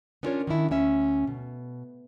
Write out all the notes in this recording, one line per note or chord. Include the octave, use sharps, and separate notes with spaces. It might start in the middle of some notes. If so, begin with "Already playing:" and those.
B3 C#4 D4 F4 A#4 C#5
D#3 C#4 D4 E4
D2 C#4 E5
B2